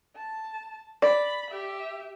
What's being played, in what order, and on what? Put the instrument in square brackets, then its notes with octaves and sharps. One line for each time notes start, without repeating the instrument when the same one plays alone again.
[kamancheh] A5
[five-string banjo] D5 [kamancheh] B5
[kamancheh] G4 E5